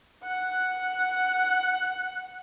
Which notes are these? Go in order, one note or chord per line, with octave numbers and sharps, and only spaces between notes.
F#5 F#6